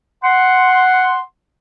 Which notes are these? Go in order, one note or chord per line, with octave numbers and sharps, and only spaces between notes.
F#5 C6